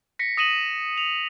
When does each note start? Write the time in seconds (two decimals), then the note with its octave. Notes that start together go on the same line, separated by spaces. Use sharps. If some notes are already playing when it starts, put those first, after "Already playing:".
0.19 A#6 B6 C#7
0.37 D#6 A#6 D#7 E7 F#7
0.98 F7